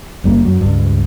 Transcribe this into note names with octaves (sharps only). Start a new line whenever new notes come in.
F#1 G3 A#3
F#2 F#3
C#2 G2